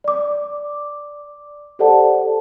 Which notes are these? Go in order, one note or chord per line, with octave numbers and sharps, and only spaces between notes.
D5 D6
G4 A4 C5 D5 F#5 A5